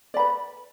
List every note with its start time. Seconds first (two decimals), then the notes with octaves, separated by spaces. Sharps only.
0.14 D5
0.17 B5
0.19 B4